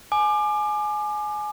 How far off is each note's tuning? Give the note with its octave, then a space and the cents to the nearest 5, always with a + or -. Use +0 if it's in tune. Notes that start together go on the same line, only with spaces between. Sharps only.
G#5 +20 D6 +30